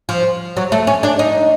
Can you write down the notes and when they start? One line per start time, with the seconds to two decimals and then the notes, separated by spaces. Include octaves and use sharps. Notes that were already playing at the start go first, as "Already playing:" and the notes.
0.09 F3
0.57 F#3
0.72 A3
0.87 C#4
1.03 D4
1.19 D#4